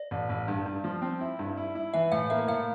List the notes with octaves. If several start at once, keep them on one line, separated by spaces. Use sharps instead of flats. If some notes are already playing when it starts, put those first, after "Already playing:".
Already playing: D5
A1
A1
G2
G2
F3
C4
E4
G2
E4
E4
E3 E5
A2 F5
A#3 E5
A2 F5